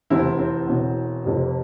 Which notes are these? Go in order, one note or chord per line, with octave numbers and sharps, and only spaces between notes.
F1 E2 C3 E3 C4 E4
C4
E1 E2 B2
F1 F2 C3